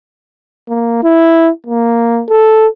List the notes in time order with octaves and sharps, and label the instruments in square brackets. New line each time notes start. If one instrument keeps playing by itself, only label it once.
[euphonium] A#3
E4
A#3
A4